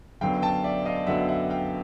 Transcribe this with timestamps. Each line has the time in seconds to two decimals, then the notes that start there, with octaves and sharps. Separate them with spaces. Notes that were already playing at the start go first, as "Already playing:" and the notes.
0.21 F#2 D3 F#3 B3 F5 G5
0.42 G5 A5
0.64 D5 E5
0.85 D#5 F5
1.07 F#2 D3 F#3 B3 E5 F#5
1.28 E5 F#5
1.50 F5 G5